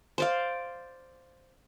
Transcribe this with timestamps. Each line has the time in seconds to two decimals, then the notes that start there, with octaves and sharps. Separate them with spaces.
0.18 C5 D5 F5